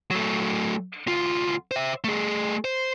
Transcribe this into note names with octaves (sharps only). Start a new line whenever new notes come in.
F#3 A3
D2 F4
C5 E5
A3 G#4
C5